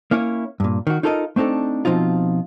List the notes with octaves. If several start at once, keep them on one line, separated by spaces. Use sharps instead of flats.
A#3 C#4 E4 C#5
G2 A#2
D#3 F#4
D#4 F4 A4 A#4 C#5 D#5
A3 C4 D4 D#4 A4
B2 F3 C4 D#4 F4